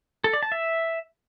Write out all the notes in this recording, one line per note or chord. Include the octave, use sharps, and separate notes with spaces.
A4
D5
A5
E5